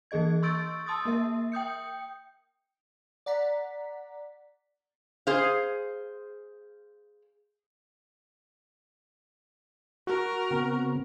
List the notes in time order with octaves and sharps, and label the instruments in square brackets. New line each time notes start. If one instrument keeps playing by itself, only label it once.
[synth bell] E3 A#3 G#4 D#5 G#6
C6 C#6 E6 G6 A6 D7
A5 C6 D#6 E6 A6
A#3 A#4 E5
G5 D#6 G6 C#7
[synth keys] D5 F#5 A#5 B6
[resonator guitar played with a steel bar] G#4 C5 F5
[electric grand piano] F#4 [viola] A#4
[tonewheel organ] C#3 B3 C4